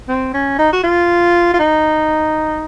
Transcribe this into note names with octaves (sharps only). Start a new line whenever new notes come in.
C4
C#4
D#4
F#4
F4
F4
D#4